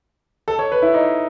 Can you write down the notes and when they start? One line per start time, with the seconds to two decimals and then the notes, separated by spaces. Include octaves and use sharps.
0.48 A4
0.59 C#5
0.72 B4
0.82 E4
0.94 D#4